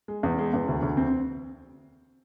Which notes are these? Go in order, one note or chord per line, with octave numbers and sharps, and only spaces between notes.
G#3
E2
G#3
E2
D2
D2
C4